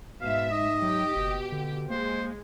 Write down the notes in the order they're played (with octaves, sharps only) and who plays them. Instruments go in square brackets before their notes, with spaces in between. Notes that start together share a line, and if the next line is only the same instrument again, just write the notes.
[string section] G#2 E5 [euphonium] B2 [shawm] F5
[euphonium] D#4 [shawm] D#5
[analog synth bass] F#3 [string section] G4
[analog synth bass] F#1 [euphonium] B2
[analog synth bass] D3
[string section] G#3 [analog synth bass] A#3 [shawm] C5